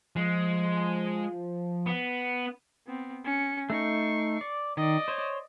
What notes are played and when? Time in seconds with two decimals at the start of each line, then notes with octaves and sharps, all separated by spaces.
0.16 F3 G#3
1.86 B3
2.87 B3 C4
3.25 C#4 C#7
3.70 A3 D#4 C#6 C7
4.41 D5
4.77 D#3 D5 D#5
5.08 C5 C#5